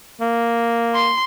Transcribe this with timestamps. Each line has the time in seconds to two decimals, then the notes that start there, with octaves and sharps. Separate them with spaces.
0.21 A#3
0.95 C6